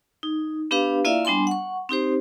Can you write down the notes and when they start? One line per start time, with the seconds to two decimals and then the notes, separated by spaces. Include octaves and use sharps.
0.23 D#4
0.71 B3 D4 G4 B4 F5
1.05 A#3 E4 F4 D5 E5 F5
1.25 G3 B3 D4 G#5 C6
1.47 F#5 C#6
1.89 C4 D#4 G4 C5